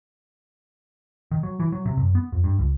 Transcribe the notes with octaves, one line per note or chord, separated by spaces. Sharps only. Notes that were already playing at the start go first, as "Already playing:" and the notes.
D#3
F#3
E3
F#3
C3
F#2
B3
F2
G2
C#2